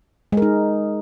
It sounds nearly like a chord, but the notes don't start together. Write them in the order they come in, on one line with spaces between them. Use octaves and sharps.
G#3 A#4 D#4